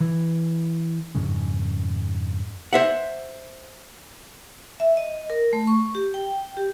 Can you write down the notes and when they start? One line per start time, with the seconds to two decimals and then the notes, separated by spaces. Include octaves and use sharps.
0.01 E3
1.15 F2 G#2 C#3
2.73 C5 E5 F#5
4.80 E5
4.97 D#5
5.30 A#4
5.53 A3
5.67 C#6
5.95 G4
6.14 G5
6.57 G4